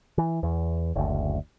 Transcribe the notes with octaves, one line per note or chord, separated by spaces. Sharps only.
E3
E2
F#1 D2